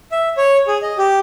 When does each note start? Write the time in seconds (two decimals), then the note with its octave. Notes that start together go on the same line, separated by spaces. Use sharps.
0.12 E5
0.37 C#5
0.67 G#4
0.82 D#5
0.98 G4